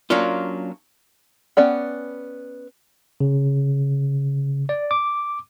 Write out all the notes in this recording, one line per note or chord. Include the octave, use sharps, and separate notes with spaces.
F#3 A#3 C#4 D4 F4
B3 C#4 D5 G5
C#3
D5
D6